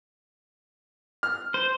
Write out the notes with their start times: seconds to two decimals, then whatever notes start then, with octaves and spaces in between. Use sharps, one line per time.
1.23 F6
1.54 C5